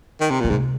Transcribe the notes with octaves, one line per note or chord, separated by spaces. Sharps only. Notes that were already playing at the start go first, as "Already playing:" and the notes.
D#3
C3
A#2 D#3
G#2 C3